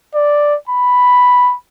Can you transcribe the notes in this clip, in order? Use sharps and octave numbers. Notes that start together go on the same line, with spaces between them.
D5
B5